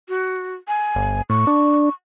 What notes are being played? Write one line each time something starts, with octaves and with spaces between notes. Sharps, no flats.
F#4
G#5
G1
A2 C#6
D4